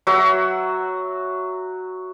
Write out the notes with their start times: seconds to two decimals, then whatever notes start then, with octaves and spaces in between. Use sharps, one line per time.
0.07 F#3 F#4 E5 E6